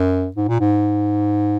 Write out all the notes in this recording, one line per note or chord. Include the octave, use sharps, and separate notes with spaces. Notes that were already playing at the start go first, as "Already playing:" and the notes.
Already playing: F#2
G#2
A#2
G#2